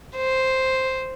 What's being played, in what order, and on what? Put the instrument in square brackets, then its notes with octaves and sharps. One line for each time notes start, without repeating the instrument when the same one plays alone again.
[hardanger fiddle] C5